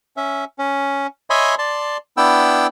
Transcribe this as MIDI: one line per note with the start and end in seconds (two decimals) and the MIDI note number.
0.17 0.44 61
0.17 0.44 76
0.58 1.07 61
1.30 1.55 73
1.30 1.55 75
1.30 1.55 76
1.30 1.55 80
1.30 1.55 83
1.30 1.55 84
1.59 1.97 74
1.59 1.97 81
1.59 1.97 84
2.17 2.67 59
2.17 2.67 62
2.17 2.67 64
2.17 2.67 79
2.17 2.67 88